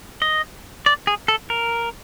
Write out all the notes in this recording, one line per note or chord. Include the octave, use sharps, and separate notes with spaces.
D#5
D5
G#4
A4
A#4